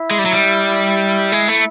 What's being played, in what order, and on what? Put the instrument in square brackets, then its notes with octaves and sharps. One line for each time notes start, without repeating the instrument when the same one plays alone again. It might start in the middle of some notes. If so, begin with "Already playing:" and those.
Already playing: [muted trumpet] E4
[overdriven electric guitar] G#3
G3
F#3
G3
G#3
A3